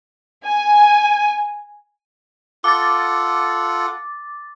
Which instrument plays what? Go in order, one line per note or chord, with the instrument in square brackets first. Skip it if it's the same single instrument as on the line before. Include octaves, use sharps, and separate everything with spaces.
[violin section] G#5
[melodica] F4 A4 F#5 [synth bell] D6 A6